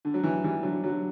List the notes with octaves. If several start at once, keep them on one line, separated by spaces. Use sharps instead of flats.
D3
F#3
E3
E3 G3
D3 F#3
D3 F#3